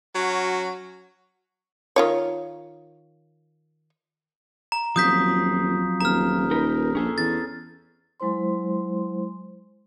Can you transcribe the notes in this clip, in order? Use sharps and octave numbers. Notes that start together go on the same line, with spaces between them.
F#3 C#4 F#4
D#3 F4 C#5
A#5
D#1 F3 F#3 C4 D#6 G6 B6
D#1 A#5 F6
D#4 A#4 B4
A#1 C#4 G#4 A4
E2 A6
F#3 G#3 E4 C5 C6